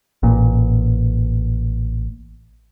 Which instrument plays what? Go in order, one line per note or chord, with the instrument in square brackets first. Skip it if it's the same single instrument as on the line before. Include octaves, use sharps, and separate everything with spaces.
[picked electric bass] A1 A#2